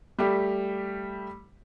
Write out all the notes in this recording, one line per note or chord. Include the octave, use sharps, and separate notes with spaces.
G3 A3 G4